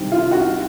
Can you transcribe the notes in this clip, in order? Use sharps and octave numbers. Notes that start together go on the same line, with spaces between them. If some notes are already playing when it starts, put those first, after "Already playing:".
Already playing: C3 D#3 G3 C4
F4
F#4